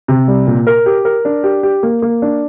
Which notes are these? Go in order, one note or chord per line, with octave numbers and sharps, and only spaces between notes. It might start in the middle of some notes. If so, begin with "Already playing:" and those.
C3
G3
A#2
A#4
G4
A#4
D4
G4
G4
A#3
A#3
D4